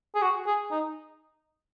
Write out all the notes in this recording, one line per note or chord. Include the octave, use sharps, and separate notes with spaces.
G#4
F#4
G#4
D#4